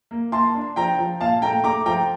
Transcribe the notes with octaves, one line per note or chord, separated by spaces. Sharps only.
A#3
A#3 A5 C6
D4
F3 G5 A#5
F3
A#2 F5 A5
A3 G5 A#5
A3 A#5 D6
F3 G5 A#5